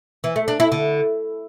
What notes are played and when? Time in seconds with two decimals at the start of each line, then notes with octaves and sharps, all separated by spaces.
0.24 E3
0.36 A3
0.48 D4
0.60 E4
0.72 D3